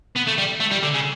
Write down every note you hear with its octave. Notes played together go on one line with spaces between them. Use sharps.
B3
A3
G3
A3
G3
D3
C#3